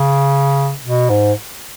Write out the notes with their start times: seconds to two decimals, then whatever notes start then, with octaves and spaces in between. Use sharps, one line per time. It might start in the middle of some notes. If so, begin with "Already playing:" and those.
Already playing: C#3
0.84 B2
1.10 G#2